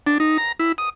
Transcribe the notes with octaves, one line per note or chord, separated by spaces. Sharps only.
D4
D#4
A#5
E4
D#6